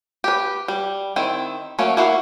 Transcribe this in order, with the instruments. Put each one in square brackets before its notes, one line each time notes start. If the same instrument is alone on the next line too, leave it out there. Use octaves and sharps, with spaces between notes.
[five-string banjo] G4 B4
G3
D#3 C4 E4
F#3 A3 A#3 C#4
A#3 E4 F#4 F5